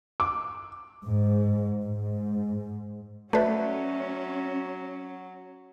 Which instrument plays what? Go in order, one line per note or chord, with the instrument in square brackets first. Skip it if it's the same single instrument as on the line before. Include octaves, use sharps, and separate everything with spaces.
[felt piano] D6
[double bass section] G#2
G#2
[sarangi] F#3 [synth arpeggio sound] A3 B4 [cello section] C#4 [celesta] F#4 D5 E5